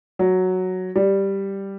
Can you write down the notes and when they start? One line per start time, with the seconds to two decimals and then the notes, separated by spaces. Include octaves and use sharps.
0.19 F#3
0.96 G3